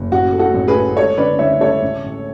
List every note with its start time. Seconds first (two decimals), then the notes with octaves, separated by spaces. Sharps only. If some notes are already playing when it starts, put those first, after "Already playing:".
Already playing: F#1
0.11 A1 F#4
0.33 A3
0.39 F#4 A4
0.54 A1
0.68 G#4 B4
0.75 A3
0.96 G#3 A4 C#5
1.17 D3 B4 D5
1.39 D2 C#5 E5
1.61 G#3 A4 C#5
1.82 A1
2.04 A1